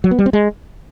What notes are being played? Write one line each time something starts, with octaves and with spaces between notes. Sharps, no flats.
F#3
B3
G3
C4
G#3